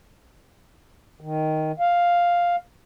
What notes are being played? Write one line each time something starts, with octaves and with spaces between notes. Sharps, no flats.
D#3
F5